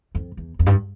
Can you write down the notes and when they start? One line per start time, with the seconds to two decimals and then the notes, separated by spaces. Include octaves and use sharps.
0.15 F2
0.37 E2
0.59 F2
0.66 G2